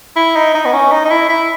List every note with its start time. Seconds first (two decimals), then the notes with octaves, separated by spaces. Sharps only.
0.16 E4
0.36 D#4
0.54 D#4
0.65 B3
0.73 C#4
0.92 D#4
1.05 D#4
1.10 E4
1.29 E4